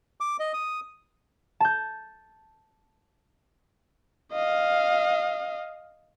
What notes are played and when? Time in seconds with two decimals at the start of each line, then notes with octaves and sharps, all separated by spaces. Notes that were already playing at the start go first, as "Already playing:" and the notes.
0.20 D6
0.40 D#5
0.53 D#6
1.60 A5 G6
4.32 D#5 F5